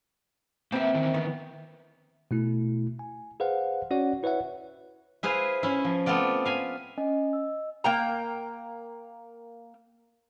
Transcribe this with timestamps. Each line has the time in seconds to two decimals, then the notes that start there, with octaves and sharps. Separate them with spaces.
0.72 A#3 C4 B4 E5
0.95 D#3 E3
1.14 B3
2.31 B2 A3 E4
2.99 G#5
3.40 G#4 B4 C5 F5 F#5
3.91 C#4 F#4 C#5 D5 F#5
4.23 E4 B4 C#5 E5 F#5
5.23 E4 G#4 B4 C5 F5
5.63 C#4 E4
5.84 F3
6.06 A3 B3 C4 F4 D5
6.45 F5 G#5 B5
6.98 C#4 D#5 G#5
7.33 D#5 E6
7.84 A#3 G5 A#5